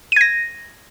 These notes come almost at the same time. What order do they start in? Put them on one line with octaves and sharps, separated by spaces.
D#7 G#6 A#6